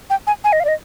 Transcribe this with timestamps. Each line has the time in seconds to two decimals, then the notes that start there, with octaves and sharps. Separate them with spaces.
0.10 G5
0.27 G#5
0.44 G#5
0.53 D#5
0.60 F5
0.65 D5
0.68 D#5